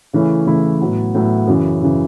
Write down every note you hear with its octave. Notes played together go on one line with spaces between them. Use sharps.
C#3 E3 A3 C#4 E4
C#3 E3 A3 C#4 E4
A2 F#3 B3 E4
A2 F#3 B3 E4
F#2 C#3 E3
F#2 C#3 E3